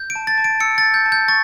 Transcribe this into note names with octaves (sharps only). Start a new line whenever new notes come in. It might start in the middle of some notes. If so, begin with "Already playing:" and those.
Already playing: G6
D7
A5
A6
A5
D7
E6 C#7
A6
G6
G6
A5
G6
C#6 A6